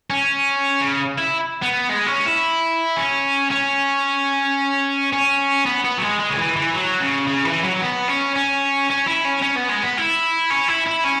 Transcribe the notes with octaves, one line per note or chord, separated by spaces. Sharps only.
C#4
C#3
E4
B3
G#3
C#4
E4
C#4
C#4
C#4
B3
B3
F#3
G#3
G#3
C#3
E3
E3
F#3
C#3
C#3
E3
F#3
B3
C#4
C#4
C#4
E4
C#4
C#4
B3
G#3
B3
E4
C#4
E4
E4
C#4